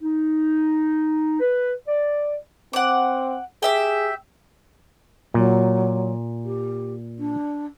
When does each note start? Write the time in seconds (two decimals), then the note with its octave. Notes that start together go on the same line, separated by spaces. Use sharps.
0.01 D#4
1.40 B4
1.88 D5
2.73 C4 F#5 D6
3.62 G4 G#4 E5 G5
5.34 A#2 F#3
6.45 G4
7.19 D4